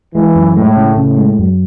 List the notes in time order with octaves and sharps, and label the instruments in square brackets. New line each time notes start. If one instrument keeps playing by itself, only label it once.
[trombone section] E3 [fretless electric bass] G#3
[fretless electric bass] F#2
[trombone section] A2 [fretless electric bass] G#3
[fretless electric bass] C#3
[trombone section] A2 [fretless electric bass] C#3
[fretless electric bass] G#3
F#2